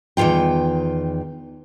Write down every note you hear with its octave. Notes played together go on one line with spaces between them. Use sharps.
E2 D#3 E3 F4 G5